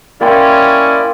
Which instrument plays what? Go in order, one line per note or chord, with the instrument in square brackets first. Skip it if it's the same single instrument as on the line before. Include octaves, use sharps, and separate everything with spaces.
[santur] A#3 G5 C6 [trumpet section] C#4 [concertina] E4 D5